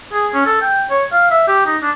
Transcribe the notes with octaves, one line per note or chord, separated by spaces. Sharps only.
G#4
C#4
A4
G5
C#5
F5
E5
G4
D#4
D4